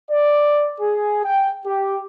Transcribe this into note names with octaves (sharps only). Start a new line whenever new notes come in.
D5
G#4
G5
G4